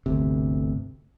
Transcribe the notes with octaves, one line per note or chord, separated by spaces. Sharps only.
G1 D2 C3